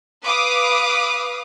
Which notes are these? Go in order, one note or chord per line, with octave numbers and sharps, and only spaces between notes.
B4 F5 D6 D#6